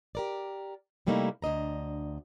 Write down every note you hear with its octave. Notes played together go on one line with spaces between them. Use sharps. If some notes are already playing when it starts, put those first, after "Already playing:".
G4 A#4 D5
C3 G3 A3 A#3 D#4 E4
D2 D4 D#5 A#5